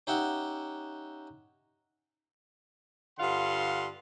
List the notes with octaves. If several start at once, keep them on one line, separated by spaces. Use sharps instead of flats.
C#4 D#4 G4 E5 F#5 G5
G2 D3 F4 F5 F#5 C6